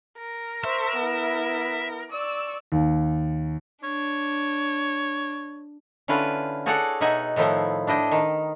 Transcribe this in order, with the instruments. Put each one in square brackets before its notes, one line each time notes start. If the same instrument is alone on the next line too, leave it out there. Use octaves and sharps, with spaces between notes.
[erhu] A#4
[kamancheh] C5 C#6 [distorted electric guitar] E5
[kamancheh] B3 E4
[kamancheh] D5 C#6 [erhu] E6
[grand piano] D#2
[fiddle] D4 [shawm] C#5
[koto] D3 C#4 E4 F4 B4
F#4 G#4 A4 C#5 D5 F#5
B2 D#4 E5 F#5 G#5
A2 D#3 F3 B3 E4 C5
D4 E4 D#5 G5
D#3